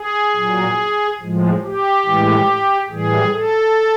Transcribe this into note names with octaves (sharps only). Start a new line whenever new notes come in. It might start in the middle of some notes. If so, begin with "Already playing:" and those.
Already playing: G#4
A#2 F#3
A2 F3 G#3
G4
A2 E3 G#3
A2 E3 G3 G#4
A4